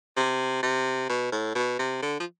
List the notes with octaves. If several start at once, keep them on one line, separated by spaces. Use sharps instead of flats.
C3
C3
B2
A2
B2
C3
D3
F3